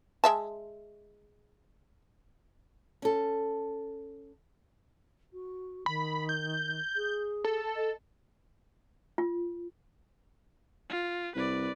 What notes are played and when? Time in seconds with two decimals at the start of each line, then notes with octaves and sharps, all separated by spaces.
0.24 G#3 E5 A5
3.02 C#4 A4
5.32 F#4
5.86 D#3 B5
6.29 G6
6.96 G#4
7.44 A4
7.75 D#5
9.18 F4
10.90 F4
11.35 C2 B4 D5